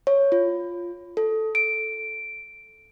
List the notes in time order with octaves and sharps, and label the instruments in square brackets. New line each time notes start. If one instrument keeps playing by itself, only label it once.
[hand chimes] C#5
F4
A4
D7